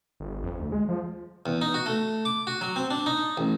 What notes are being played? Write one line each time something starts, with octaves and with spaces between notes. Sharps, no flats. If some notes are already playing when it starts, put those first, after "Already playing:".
G1
F2
D2
G#3
F3
E2
D#4
F#4
A3
D6
F#4
F#3
C4
D4
D#4
A1